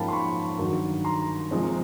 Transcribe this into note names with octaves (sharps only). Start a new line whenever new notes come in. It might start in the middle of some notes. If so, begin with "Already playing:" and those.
Already playing: G#2 F3 A#3 C#4 F5 G5 A5 B5
C6
B5 C#6
G2 D#3 F#3
A#5 C6
C3 F3 G#3 C4